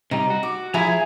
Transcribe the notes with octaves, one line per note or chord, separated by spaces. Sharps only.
C3 G3 D#4
F#4
D6
F3 E4 G#4 A#5